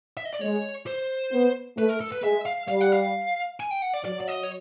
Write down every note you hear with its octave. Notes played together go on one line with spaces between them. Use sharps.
E5
D#5
D5
G#3 C#5
C5
B3
A3 B4
A#4
A4
B4
G#3 E5
F5
G3 F5
F#5
F5
G#5
G5
F#5
D5
F#3 D5
D5
D#5
C#5